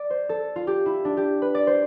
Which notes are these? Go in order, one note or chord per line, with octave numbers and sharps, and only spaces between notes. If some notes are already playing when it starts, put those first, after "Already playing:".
Already playing: D5
C5
A4
F4
G4
E4
D4
G4
B4
D5
C5